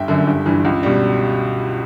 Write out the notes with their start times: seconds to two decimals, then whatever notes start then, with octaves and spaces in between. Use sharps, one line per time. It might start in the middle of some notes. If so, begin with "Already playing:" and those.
Already playing: G1 E5 G5
0.08 F#2 D3
0.27 G1
0.46 G2 E3
0.65 C#2
0.83 B2 G3